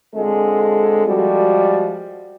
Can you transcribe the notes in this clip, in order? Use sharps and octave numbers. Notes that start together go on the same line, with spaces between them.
D3 G#3 C4 F4 A4
F3 G3 G#3 F#4